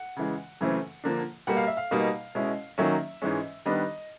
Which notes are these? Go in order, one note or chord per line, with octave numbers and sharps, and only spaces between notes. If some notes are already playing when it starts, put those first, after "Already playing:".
Already playing: F#5
C#3 E3 G#3
F#2 C#3 E3 A3 C4
D3 F3 A#3 D4
B2 G3 A#3 F#5
F5
E5
F5
B2 G3 A#3 D#4
B2 G#3 C#4 E4
D#3 F#3 A#3 C#4 E5
G#2 E3 G#3 C#4
D#3 G3 B3 D4 D#5